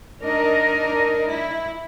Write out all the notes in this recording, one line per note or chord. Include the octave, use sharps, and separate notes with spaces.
D4 D#4 A#4 D#5
E4